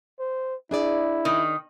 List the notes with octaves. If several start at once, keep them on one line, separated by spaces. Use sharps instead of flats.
C5
D4 E4 G#4 D5
D#3